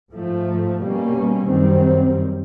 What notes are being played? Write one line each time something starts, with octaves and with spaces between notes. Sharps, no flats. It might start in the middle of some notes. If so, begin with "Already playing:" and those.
G#2 F3 A3
B2 G3 A#3 C#4
F#2 D#3 G3 C4